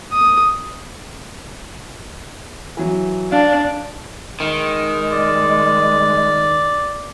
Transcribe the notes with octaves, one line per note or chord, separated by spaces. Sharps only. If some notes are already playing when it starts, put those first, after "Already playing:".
D#6
E3 F#3
D4 F5
D#3 G#3
D5